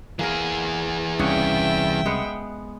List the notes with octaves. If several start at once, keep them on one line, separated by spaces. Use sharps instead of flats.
E3 A#3 G#4 A#4
C2 C#3 D4 C#5 E5 G5
G#3 B3 F#5